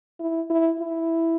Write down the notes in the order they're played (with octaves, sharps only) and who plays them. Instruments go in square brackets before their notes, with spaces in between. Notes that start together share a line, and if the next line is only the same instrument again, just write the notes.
[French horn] E4
E4
E4